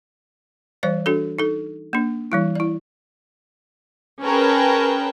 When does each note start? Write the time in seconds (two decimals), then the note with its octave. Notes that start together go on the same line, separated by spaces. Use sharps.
0.83 E3 G3 C5 D5
1.06 D4 F#4 A4
1.39 D#4 A4
1.93 A#3 D4
2.32 E3 G3 E4
2.55 E4 D5
4.23 C#4 G#4 A#4 B4 G5 A5